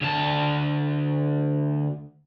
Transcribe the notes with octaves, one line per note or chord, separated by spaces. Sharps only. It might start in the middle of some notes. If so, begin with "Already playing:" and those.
D2 A5